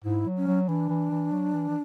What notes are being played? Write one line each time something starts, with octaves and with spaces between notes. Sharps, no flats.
G#2 E4
F#3
C#4
F#3
E3 D4
E3
E3
F#3
E3
E3